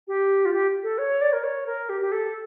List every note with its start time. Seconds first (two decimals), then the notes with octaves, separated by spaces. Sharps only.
0.08 G4
0.45 F4
0.53 G4
0.83 A4
0.98 C#5
1.21 D5
1.33 A#4
1.44 C#5
1.67 A#4
1.89 G4
2.01 G4
2.12 A4